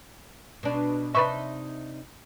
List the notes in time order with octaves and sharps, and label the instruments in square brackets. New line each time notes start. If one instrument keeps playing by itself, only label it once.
[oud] B2 D4
[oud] C3 D#4 E5 [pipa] D4 B4 C#6